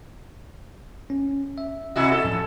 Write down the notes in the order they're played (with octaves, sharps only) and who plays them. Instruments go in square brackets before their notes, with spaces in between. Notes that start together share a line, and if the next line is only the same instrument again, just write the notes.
[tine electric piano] C#4
E5
[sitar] C3 E4 F#4 [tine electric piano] D#5 E5 G#5
[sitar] C#4 A4
[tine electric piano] A2 F3